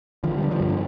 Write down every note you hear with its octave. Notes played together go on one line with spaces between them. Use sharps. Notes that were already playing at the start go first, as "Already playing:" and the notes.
D3 F3
G3
D3
F3
G2
D3